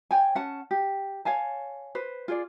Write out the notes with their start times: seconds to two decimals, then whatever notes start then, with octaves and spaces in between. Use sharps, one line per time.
0.11 C#5 G5 G#5
0.35 C#4 F#5 A5
0.71 G4
1.25 C#5 F5 G#5 A5
1.95 B4 C5
2.28 F4 G#4 D5